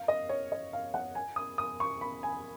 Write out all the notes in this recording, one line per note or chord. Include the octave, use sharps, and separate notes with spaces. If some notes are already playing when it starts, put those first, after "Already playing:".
Already playing: F5
D#5
C#5
D#5
F5
F#5
G#5
D#6
D#6
C#6
B5
G#5